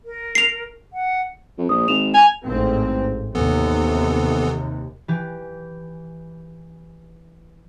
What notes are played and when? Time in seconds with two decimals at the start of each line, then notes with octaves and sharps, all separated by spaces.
0.05 A#4
0.35 C7 F7
0.93 F#5
1.58 F2
1.69 A#1 D#6
1.88 G#1 E7 F7
2.14 G#5 F7
2.45 A1 G#2 C4
3.35 D#2 C3 E3 B3 A4
5.08 E3 G4